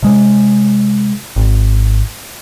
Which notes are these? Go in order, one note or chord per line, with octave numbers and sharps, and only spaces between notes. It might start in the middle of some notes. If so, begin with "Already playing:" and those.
C3 G#3
G#1